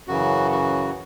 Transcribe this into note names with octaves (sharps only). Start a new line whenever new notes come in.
F#2 C#3 E3 F#4
F#4